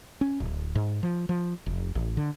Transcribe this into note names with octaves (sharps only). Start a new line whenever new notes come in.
C#4
D1
G#2
F3
F3
F1
A1
D3